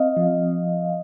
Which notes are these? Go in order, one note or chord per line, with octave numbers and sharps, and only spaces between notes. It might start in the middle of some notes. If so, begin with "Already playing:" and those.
Already playing: C4 D#5 F5
F3